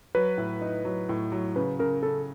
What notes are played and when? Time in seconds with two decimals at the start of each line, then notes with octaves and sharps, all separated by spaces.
0.15 F#3 B4
0.38 A2
0.61 D#4
0.85 F#3
1.09 A2
1.32 F#3
1.56 C#3 B4
1.79 C#3 A#4
2.03 C#3 A4